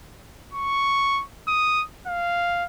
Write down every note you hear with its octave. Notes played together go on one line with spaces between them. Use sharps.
C#6
D#6
F5